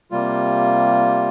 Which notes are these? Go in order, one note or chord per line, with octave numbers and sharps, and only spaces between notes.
C3 G3 A#3 F4